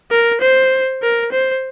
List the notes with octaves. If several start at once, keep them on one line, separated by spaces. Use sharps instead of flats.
A#4
C5
A#4
C5